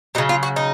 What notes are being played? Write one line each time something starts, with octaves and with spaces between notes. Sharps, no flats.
C#3 F#3 D#4
F4
F#4
D#4